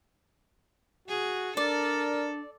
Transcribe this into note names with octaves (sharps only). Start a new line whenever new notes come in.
F#4 G#4
D4 A4 A#4 D5